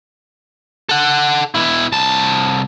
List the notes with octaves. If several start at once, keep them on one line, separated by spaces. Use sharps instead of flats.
A4 F#5
B2 E4
C2 A5